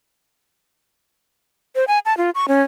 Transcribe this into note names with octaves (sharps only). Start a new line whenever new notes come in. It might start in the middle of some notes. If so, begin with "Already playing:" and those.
C5
G#5
A5
F4
C#6
C#4